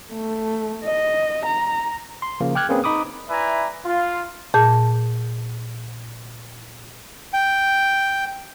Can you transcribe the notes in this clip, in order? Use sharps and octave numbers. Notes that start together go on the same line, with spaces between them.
A3
D#5
A#5
C6
C#3 F3 A#3
G5 D6 F6 F#6 G#6
A#3 C4 C#4 G#4 A#4 B4
D#4 B5 D6 D#6
E4 B4 D5 E5 G#5 A#5
F4
A#2 G#4 A5 G6
G5